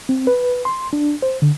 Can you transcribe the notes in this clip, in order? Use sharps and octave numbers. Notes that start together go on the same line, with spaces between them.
C4
B4
C6
D4
C5
D3